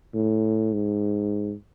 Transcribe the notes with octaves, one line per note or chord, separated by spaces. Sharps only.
A2
G#2